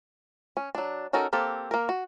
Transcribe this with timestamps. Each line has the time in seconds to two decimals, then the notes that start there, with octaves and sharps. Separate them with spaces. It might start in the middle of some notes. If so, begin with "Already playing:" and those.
0.57 C#4
0.75 F#3 D4
1.13 C#4 D#4 F#4 A4 A#4
1.33 A#3 C4 G4 A4
1.71 A#3 A#4
1.89 F#4